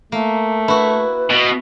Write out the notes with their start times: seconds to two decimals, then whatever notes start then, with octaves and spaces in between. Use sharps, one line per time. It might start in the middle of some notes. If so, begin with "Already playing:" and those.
0.12 A3 A#3
0.68 E4 F#4 B4
1.30 B2